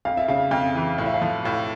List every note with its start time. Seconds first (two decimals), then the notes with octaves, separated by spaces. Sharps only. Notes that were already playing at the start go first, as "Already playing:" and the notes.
0.05 F2 F5
0.17 E5
0.28 C#3 F5
0.51 F2 F5
0.75 E3
0.98 A2 F5
1.06 E5
1.14 F5
1.22 F3
1.45 A2 F5